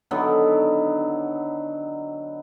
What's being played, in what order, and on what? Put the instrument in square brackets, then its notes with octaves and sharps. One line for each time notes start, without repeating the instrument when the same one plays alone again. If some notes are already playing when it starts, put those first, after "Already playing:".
[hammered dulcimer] D3 D#3 F#3 B3